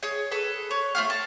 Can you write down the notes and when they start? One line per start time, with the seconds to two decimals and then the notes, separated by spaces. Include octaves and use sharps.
0.03 G#4 C#5
0.31 G#4 A4 B4
0.71 C#5
0.95 A3 F4 F5
1.10 A5